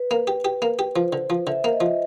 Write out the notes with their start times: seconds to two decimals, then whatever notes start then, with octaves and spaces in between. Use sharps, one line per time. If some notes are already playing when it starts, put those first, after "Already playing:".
Already playing: B4
0.11 A#3
0.27 G4
0.45 G4
0.62 A#3
0.79 G4
0.96 F3 C5
1.13 D3
1.30 F3
1.47 D3 E5
1.64 A#3
1.73 D#5
1.81 F3